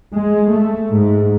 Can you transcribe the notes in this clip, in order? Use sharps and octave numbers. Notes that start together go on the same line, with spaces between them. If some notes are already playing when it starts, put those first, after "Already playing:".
G#3
A3
G#2